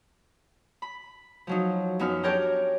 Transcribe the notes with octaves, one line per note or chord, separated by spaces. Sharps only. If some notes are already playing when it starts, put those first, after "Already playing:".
B5
F3 F#3 D#4
F#2 B3 D#4 F6
D4 G4 A#4 C#5 G5 A#5